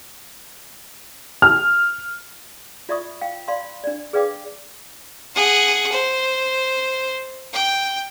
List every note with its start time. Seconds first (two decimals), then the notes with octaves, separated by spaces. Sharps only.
1.42 F6
2.89 F4 D5 E5 B5 C#6 D#6
3.21 F5 G5
3.48 D5 F5 B5 C6
3.84 D4 D5
4.13 G#4 B4 D5 F5 G5 D6
5.35 G#4 F#5
5.92 C5
7.53 G5